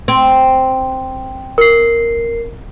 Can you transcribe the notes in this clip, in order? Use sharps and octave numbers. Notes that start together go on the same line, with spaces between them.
C4
A#4 C7